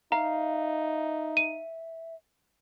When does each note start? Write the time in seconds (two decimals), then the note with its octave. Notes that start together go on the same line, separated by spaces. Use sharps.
0.12 D#4 E5 F5 A#5
1.37 D#7